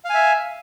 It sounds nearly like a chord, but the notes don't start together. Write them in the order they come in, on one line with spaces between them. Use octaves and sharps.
F5 G#5 E5